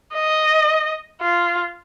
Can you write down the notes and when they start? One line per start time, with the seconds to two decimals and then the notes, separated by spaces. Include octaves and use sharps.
0.14 D#5
1.21 F4